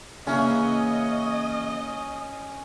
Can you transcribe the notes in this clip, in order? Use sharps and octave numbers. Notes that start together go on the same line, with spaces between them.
C#3 E3 A#3 C#4 D#5